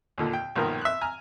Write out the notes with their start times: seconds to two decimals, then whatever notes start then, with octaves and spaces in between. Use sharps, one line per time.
0.18 D#2 A#2 D3
0.33 G5
0.55 B1 G2 A#2 D#3 F3 A#4
0.81 E5 F#6
1.01 G#5 A#5 F6